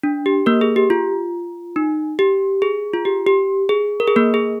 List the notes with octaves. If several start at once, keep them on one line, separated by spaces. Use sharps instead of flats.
D4
G4
A#3 A#4
G#4
G4
F4
D#4
G4
G#4
F4
G4
G4
G#4
A#4
G#4
A#3 A#4
G#4